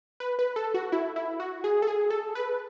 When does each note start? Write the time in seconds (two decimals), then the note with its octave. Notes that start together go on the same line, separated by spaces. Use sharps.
0.20 B4
0.39 B4
0.56 A4
0.74 F#4
0.92 E4
1.16 E4
1.40 F#4
1.64 G#4
1.82 A4
1.87 G#4
2.10 A4
2.35 B4